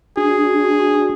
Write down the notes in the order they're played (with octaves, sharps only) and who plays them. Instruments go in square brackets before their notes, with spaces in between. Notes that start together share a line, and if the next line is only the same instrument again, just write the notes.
[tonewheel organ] D4 F#4 [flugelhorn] G#4